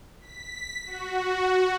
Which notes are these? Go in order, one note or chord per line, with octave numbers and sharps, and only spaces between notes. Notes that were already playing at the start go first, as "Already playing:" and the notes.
B6
F#4